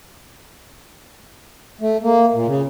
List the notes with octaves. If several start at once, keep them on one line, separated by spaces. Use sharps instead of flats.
A3
A#3
A#2
C#3